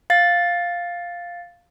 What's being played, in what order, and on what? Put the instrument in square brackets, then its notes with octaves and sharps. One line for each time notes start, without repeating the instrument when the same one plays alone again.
[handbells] F5 A6